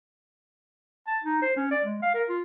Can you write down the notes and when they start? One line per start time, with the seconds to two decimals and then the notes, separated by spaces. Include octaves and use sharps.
1.07 A5
1.24 D#4
1.42 C5
1.56 C#4
1.71 D5
1.85 G#3
2.02 F5
2.15 A#4
2.29 F4